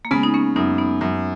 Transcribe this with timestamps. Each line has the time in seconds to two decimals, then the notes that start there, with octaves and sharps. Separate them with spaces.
0.05 A#3
0.11 C#3 G#3 B3
0.23 D#4
0.34 A#3 C#4
0.56 F#2 B3 D#4
0.78 B3 D#4
1.01 F#2